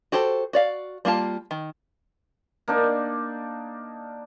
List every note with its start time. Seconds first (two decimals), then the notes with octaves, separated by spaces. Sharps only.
0.12 F#4 G4 A4 C5
0.53 F#4 D5 F5
1.05 G3 A#3 F4 A5
1.51 D#3
2.68 A#3 D4 D#4 D5